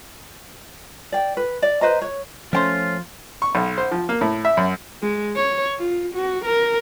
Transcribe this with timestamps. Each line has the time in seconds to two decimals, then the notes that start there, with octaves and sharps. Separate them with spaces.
1.12 D5 G5
1.37 B4
1.62 D5
1.81 B4 C5 D#5 A#5
2.02 C#5
2.53 F3 A3 C#4 F4 C5 G5 C6
3.42 C#6
3.55 B1
3.78 C5
3.91 F3
4.09 A#3
4.21 A2
4.45 E5
4.57 F#2
5.02 G#3
5.36 C#5
5.79 F4
6.14 F#4
6.45 A#4